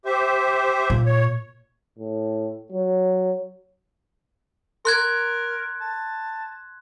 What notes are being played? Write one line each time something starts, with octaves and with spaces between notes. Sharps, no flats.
G4 C5 E5
A#2
C#5
A2
F#3
A#4 C6 F#6 G#6
A5